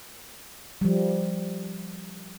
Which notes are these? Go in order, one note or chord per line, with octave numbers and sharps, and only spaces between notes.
F3 G3